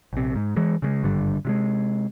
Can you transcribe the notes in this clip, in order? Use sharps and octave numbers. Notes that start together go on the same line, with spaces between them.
A#1 C3
G#2
E3 G#3
C#3 G3 G#3
G#1 G2 D3 G3
C3 F3 G#3